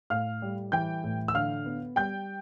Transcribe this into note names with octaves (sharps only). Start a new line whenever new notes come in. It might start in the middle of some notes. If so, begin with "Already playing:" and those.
A2 F5 F6
G3
E3 G5 G6
A2
E6
D3 F5 F6
B3
G3 G5 G6